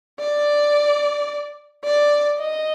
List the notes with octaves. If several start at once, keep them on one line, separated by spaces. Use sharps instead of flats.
D5
D5
D#5